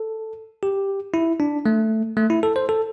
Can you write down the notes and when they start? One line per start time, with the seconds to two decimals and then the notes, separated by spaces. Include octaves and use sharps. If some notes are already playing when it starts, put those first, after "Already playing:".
Already playing: A4
0.63 G4
1.14 E4
1.40 D4
1.66 A3
2.17 A3
2.30 E4
2.43 A4
2.56 C5
2.69 A4